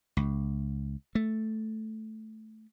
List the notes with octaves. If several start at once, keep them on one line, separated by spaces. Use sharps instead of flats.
C#2
A3